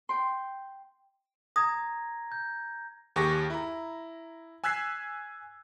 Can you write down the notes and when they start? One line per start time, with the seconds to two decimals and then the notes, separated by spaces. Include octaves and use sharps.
0.09 G5 C6
1.56 A#5 D#6 G#6 A#6
2.32 G6
3.16 D#2 G4 G#4 C#6 A#6
3.50 E4 A#5
4.64 G#5 E6 F#6 G#6 B6 C7